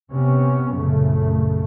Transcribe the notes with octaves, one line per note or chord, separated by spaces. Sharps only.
C3 B3 C#4
A#1 F#2 C#3 A3